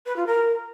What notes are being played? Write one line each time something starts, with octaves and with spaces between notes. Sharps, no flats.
B4
F4
A#4